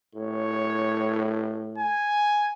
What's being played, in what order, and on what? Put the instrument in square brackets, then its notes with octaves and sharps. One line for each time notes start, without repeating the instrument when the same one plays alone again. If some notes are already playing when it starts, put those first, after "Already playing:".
[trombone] A2 [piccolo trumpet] C#5
[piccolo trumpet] G#5